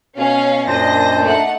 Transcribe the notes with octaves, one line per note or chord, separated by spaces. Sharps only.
B2 C#4 F5
F#2 A#2 D4 C5 D#5 A#6
A3 D#4 F#5